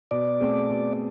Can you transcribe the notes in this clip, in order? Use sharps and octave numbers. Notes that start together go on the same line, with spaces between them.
B2 D5
A3 C4 G#4
B2